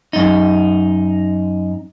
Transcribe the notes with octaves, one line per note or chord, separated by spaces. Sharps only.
F#2 D#4